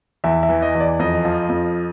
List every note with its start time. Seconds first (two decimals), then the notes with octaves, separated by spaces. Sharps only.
0.24 E2 E5
0.43 E5
0.49 E3
0.62 D#5
0.75 E2
0.80 D5
0.99 F2 D#5
1.25 F3
1.49 F2